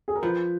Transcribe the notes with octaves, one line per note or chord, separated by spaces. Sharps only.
G#4
A#4
F3 B4